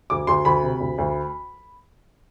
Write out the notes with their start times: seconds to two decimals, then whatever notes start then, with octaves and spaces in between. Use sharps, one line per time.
0.10 D2 D6
0.27 D2 C6
0.45 D2 B5
0.63 C3
0.80 D2
0.98 D2